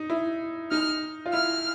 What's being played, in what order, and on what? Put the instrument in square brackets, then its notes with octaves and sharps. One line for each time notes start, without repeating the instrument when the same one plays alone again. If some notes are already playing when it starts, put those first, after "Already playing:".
Already playing: [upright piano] D#4
E4
[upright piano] D#4 [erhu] F6
[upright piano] F4
[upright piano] E4 [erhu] F6